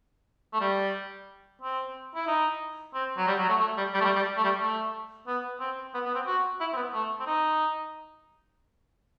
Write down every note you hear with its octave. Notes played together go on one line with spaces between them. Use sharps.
A3
G3
C4
E4
D#4
C4
F#3
G3
F#3
A3
A3
G3
G3
A3
G3
G3
A3
G3
A3
B3
C4
B3
B3
C4
F#4
E4
C4
B3
A3
C4
D#4